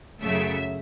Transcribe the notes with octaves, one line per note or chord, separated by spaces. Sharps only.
F#2 C#3 F#3 A3 E5